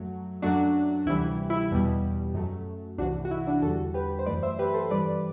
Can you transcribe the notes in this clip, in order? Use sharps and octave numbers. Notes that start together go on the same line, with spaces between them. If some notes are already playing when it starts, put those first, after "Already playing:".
Already playing: F#2 F#3 A3
F#2 F#3 A3 D4 F#4
D2 C3 E3 G3 E4
E4
E2 B2 G3
F#2 F#3 A3
C2 C3 E3 D4 F#4
F#4
E4
D4 F#4
E2 D3 G3 F#4 A4
G4 B4
C5
F#2 E3 A3 B4 D5
C5 E5
G4 B4
A4 C5
G2 E3 G3 B4 D5